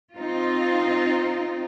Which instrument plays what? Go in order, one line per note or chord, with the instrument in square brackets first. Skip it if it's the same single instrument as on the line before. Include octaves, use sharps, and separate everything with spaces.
[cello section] C4 D#4 F4